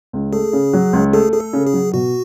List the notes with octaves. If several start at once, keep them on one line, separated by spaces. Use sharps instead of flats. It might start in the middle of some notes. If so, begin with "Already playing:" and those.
C#2
A3 G#4
C#3
F#3
C#2
A3 G#4
A3 G#4
A4
C#3
G#4
F#3
B2 F#4